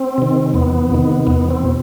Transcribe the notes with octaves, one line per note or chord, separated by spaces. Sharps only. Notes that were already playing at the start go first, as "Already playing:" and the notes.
Already playing: C4
C3 D#3
E2 B3
C3 D#3
E2 B3
C4
B2